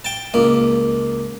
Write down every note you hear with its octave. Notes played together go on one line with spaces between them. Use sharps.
G5 A5
C#2 A#3